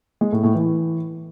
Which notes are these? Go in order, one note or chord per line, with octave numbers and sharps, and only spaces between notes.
G#3
A2
A2
E3